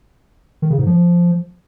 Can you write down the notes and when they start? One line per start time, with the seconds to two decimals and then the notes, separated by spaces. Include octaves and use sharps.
0.62 D#3
0.70 C#3
0.78 G#2
0.86 F3